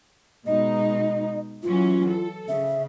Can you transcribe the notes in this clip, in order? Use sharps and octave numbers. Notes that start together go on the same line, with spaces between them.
B2 G#3 D#4 D#5
E3 F#3 C#4 F4
A4
C#3 E5